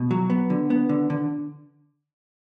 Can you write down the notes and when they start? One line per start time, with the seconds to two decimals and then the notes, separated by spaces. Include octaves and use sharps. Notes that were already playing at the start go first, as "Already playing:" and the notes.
Already playing: B2
0.11 F#3
0.30 B3
0.50 D3
0.70 B3
0.89 D3
1.10 D3